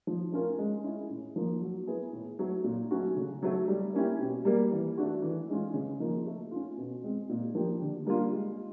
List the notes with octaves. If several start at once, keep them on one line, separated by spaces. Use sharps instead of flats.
F3
A3 C#4 F4 A#4
G#3
C#4 E4
A2
F3 A#3
F#3
B3 E4 G#4 B4
A2
F#3 A3
A#2
F#3 A3 C#4 F#4
C#3
F#3 A3
G3
A#3 C#4 E4 G4
B2
G3 A#3
E3
A3 D4 F#4
E3
G#3 C#4 F4
C#3
F3 A#3 D#4
A3
C#4 F4
B2
G#3 C4
A#2
F3 A#3 D4 G4
D3
G3 A#3 D4 F4
G#3